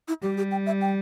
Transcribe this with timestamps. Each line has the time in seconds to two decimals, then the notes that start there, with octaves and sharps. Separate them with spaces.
0.08 E4
0.22 G3 G4
0.38 G4
0.51 G5
0.66 E5
0.81 G5